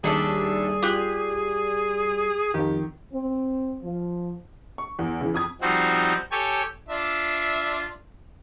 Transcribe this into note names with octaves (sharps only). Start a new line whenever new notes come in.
D#2 G3 D4 G#4 A4 D5 E5 A5
F4 G4 F#6
F2 D#3 F3 G4
C4
F3
C#6
E2
C#3 E3
F2 D#6 G#6
F3 G3 C4 D#4 F#4
G4 A4 C#5 G#5
D4 F4 E5